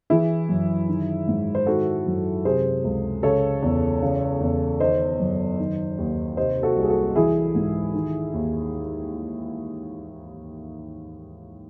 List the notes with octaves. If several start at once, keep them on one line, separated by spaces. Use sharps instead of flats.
E3 E4 G#4
F#2
D#3
G#2
C5
D#3 F#4 A4
F#2
C3 G#4 C5
C#2
C#3 A4 C#5
E2
C#3
E2
D#3 C5 D#5
F#2
D#3
D#2
C3 C5 D#5
F#4 A4
C2
G#4
F#4 A4
E3 E4 G#4
G#2
D#3
D#2